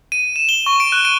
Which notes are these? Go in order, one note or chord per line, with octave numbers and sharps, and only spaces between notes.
D#7
E7
G7
C#6
D7
F#6
D#7